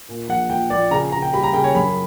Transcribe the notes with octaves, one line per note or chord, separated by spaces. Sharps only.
A#2
A#1 F#5
A#1 G5
A#1 D5
C#3 A#5
C#3 A#5
G5
G3 B5
A#5
C#3 G5
C#5
F#2 B5